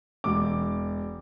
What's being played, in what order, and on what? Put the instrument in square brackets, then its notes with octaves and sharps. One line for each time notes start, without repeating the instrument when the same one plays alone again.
[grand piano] E1 D6